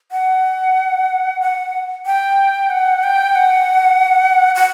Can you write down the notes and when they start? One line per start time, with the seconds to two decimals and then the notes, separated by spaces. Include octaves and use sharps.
0.12 F#5
1.41 F#5
2.06 G5
2.70 F#5
3.03 G5
3.35 F#5
4.55 F#5